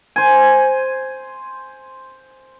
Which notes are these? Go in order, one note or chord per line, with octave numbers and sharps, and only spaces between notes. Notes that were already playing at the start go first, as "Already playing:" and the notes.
C5 G#5